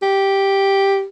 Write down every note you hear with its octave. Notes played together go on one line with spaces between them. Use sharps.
G4